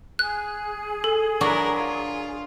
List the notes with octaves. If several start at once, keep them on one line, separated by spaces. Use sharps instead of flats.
G#4 F#6
A4
F#3 D4 E4 F#4 A#4
F4